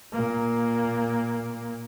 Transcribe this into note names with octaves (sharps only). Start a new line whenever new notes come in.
A#2 A#3